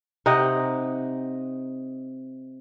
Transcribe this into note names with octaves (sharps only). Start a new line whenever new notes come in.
C3 D#4 D#5 F#5